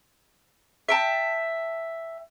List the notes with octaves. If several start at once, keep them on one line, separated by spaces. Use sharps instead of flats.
E5 G5 A5